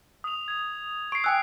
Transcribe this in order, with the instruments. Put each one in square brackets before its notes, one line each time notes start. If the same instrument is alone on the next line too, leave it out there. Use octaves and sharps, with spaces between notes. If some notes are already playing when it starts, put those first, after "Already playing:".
[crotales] D#6 F7
G#6 F7
[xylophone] C#6 [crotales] C7 D7
[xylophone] G5 G#5 E6 [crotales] F#6